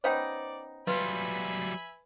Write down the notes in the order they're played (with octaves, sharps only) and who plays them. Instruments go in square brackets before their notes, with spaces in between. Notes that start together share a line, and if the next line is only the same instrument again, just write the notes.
[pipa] B3 C#4 D#4 [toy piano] C5 F5 G5 [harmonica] D5
[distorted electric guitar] F#3 G3 [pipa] F4 [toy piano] B4 [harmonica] E5 G#5 B5